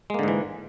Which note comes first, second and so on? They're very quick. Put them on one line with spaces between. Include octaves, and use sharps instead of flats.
G#3 A#3 D3 G#2 E3